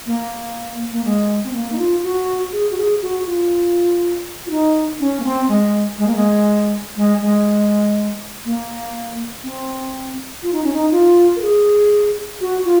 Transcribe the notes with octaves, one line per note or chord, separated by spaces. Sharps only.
A#3
A#3
G#3
C4
A#3
D#4
F4
F#4
G#4
F#4
G#4
F#4
F4
F4
D#4
C#4
A#3
C4
G#3
G#3
A#3
G#3
G#3
G#3
A#3
C4
F4
D#4
C#4
D#4
F4
A#4
G#4
F#4
F4